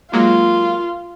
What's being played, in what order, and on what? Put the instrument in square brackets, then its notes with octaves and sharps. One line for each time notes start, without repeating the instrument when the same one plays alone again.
[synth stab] F#3 G#3 A#3 [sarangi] F4